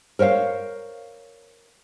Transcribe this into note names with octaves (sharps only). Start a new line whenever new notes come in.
A#4 C5 C#5 E5 F5